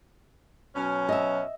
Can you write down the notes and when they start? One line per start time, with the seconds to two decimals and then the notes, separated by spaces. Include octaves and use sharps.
0.75 B2 F#3 C#4
1.09 D#5 E5